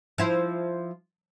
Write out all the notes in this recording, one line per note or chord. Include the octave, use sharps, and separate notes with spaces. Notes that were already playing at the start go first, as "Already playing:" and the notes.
F3 E4 C5